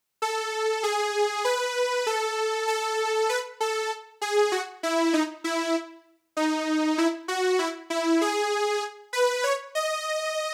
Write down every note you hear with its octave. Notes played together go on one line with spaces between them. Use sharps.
A4
G#4
B4
A4
A4
B4
A4
G#4
F#4
E4
D#4
E4
D#4
E4
F#4
E4
E4
G#4
B4
C#5
D#5